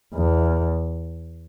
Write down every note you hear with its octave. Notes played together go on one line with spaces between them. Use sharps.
E2